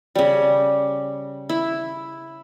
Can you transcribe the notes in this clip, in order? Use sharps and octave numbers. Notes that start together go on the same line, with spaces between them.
C#3 G3
E4